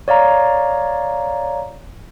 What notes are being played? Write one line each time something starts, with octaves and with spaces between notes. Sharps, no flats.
C#5 D5 F5 A#5